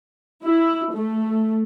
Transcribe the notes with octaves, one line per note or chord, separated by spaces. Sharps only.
E4
A3